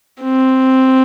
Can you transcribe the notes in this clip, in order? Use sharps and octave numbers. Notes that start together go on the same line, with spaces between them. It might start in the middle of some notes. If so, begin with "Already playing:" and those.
C4